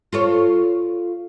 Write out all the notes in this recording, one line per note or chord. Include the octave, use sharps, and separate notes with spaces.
F4 A4 C#5